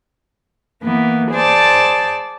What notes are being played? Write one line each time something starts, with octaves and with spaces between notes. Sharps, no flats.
E3 A#3 B3
G#4 C5 D5 A5